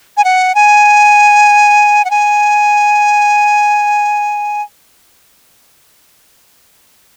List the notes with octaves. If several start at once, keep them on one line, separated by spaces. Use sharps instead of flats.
G#5
F#5
G#5
F#5
G#5